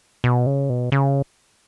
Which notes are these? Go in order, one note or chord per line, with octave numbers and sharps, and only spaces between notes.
B2
C#3
B2
C#3